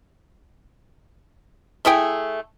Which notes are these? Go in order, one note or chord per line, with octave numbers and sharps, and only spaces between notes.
A3 E4 G#4 G5